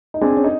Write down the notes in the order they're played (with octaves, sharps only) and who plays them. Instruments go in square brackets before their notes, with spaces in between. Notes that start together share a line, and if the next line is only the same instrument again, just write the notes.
[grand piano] D#4
[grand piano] C4 D4 [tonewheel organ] G#4
[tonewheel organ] C#4
[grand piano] D#4